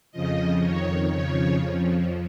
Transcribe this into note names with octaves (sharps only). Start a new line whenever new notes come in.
F2 C#3 F3 D#5
F2 D#3 C#5
F2 C#3 F3 C#5
F2 F3